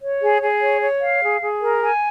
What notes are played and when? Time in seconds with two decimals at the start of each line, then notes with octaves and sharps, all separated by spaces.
0.02 C#5
0.22 G#4
0.42 G#4
0.61 C#5
0.81 C#5
1.01 F5
1.22 G#4
1.41 G#4
1.61 A#4
1.81 G#5